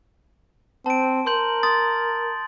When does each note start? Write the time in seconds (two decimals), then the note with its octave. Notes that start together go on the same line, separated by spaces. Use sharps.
0.86 C4 A5 D7
1.26 A#4 C6 G6 F#7
1.63 C6 D#6 A6